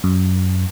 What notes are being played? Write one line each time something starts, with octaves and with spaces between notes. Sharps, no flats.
F#2